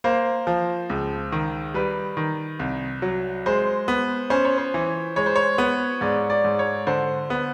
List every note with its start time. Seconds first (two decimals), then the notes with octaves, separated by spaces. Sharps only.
0.04 A#3 C5
0.47 F3
0.90 C#2
1.32 D#3
1.74 G3 B4
2.17 D#3
2.59 C2
3.02 F#3
3.46 G#3 C5
3.88 B3
4.30 C#4 C5
4.45 C#5
4.58 C5
4.74 E3
5.16 G#3 C#5
5.26 C5
5.36 C#5
5.58 B3
6.01 G#2 D5
6.30 D5
6.45 G#2
6.59 C#5
6.87 D3 C5
7.30 B3